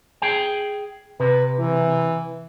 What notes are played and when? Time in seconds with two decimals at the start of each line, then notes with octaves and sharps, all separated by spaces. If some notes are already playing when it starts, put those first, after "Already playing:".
0.22 G#4 G5
1.20 C3 B4
1.59 E3